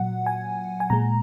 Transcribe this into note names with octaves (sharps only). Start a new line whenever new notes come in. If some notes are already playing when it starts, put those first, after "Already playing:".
Already playing: A#2 F#3 F#5
G#5
G#5
A#2 G#3 A#5